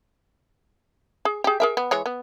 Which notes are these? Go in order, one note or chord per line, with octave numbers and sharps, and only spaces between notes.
G#4
G4 G#4
G#4 A#4 E5
B3
E3 G#3 C#5
B3